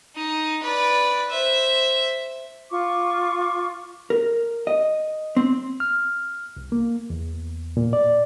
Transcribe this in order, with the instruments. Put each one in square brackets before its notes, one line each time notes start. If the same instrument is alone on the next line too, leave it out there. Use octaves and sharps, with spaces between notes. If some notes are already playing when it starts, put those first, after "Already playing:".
[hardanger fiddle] D#4
B4 D5
C5 E5
[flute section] F4 C#6 D6
[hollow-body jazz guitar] A#4
D#5
C4
[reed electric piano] F6
C2
A#3
E2
A#2
D5